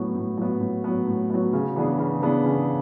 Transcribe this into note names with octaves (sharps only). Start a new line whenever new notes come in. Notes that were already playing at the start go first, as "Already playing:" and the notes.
Already playing: A2 F#3 B3
A2
F#3 B3
A2
F#3 B3
A2
F#3 B3
C#3
E3 B3 D4 G#4
C#3
E3 B3 D4 G#4
C#3